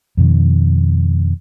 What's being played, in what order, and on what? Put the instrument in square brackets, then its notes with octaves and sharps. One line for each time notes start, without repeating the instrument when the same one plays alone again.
[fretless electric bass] F2 B2 D#3